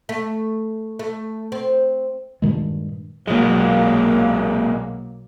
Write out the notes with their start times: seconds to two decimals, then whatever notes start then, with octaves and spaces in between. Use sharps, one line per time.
0.09 A3
0.99 A3
1.52 C4
2.42 G2 A#2 D#3 G#3
3.28 B1 A#2 F#3 G#3 A#3